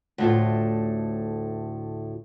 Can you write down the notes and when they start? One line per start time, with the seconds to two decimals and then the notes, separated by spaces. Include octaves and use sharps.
0.18 D2 A2 F4